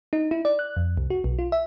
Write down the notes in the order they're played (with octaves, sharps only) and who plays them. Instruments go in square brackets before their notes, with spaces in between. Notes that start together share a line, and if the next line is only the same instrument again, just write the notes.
[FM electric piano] D#4
E4
D5
F#6
F2
C2
F#4
B1
F4
E5